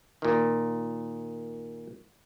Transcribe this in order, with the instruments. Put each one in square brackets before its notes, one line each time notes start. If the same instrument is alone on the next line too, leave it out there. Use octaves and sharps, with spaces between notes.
[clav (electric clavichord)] A#2 D#3